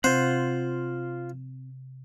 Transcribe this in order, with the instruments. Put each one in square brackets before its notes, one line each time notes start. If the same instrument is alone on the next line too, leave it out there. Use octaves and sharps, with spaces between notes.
[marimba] C3 [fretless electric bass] C4 [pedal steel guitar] F4 F#5 [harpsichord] C5